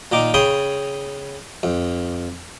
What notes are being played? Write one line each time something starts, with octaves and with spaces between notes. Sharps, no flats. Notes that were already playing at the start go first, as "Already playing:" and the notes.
A#2 D#3 D#4 D6
C#3 C#5 G5 B5 C6 D#6
F2